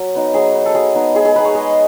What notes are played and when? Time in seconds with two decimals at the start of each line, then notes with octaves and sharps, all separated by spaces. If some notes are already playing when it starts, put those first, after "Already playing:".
Already playing: F#3
0.15 B3 D#4
0.34 F#3 G#4
0.55 B3 D#4
0.65 A4
0.75 F#3 G#4
0.95 B3 D#4
1.15 G#3 G#4
1.25 G#4
1.35 B3 D#4 B4
1.45 C#5
1.55 G#3 D#5